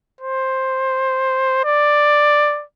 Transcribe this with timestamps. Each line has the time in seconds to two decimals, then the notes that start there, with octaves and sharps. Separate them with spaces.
0.21 C5
1.65 D5